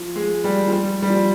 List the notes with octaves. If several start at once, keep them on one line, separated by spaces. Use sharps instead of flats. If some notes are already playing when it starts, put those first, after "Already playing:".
Already playing: F3
G#3
G3
F3
G3
G3
F3